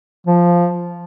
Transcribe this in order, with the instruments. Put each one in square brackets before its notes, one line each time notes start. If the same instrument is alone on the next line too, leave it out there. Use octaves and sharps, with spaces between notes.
[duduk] F3